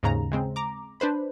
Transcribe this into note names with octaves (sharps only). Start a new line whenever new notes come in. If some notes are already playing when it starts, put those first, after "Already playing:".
D#2 G#2 C#3 A#5
C#3 G#3 C4
A#5 D6
D4 B4 C5 B5